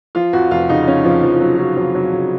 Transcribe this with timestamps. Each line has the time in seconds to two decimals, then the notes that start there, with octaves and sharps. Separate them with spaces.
0.15 F3 F4
0.33 F2 F#4
0.51 F1 F4
0.69 C#3 D#4
0.87 F3 C#4
1.05 F2 F3
1.23 F1 F3
1.34 F3
1.40 C#3 F#3
1.58 F3 F#3
1.76 F2 F#3
1.95 F1 F#3
2.13 C#3